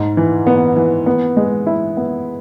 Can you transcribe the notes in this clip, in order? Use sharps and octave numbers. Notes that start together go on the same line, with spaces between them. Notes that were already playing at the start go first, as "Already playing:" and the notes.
Already playing: G#2
E3
B3
E3
B3
G#3
E4
B3